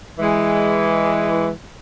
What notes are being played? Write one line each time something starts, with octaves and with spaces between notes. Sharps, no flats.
E3 G#3